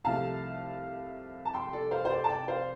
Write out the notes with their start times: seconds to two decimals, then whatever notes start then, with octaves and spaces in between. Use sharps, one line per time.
0.04 C2 C3 F3 A3 F5 A5
1.45 A5
1.53 G5 C6
1.73 A4 D5
1.91 C5 F5
2.05 C5
2.10 A4 D5
2.24 A5
2.29 D5 G5
2.48 C5 F5